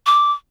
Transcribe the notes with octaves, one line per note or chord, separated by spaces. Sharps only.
D6